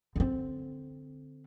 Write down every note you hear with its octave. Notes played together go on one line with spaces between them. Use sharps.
D3 C4